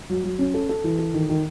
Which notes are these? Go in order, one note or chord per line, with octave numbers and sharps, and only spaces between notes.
F#3
F#3
C#4
A4
A4
E3
A4
D#3
D#3